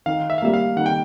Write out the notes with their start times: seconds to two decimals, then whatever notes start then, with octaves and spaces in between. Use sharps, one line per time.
0.06 D#3 F5
0.30 E5
0.38 F5
0.42 G3 A#3 E5
0.54 F5
0.77 D#3 F#5
0.86 G5